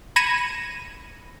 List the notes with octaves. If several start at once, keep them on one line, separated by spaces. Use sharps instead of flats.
B5 G#6 A#6 C#7 D#7 E7